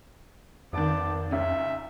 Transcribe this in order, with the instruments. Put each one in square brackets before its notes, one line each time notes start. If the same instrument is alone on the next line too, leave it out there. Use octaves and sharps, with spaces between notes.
[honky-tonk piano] G#1 D#3 [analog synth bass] F2 [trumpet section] B3 A5 D6
[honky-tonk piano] C#2 C#4 [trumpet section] D#4 E5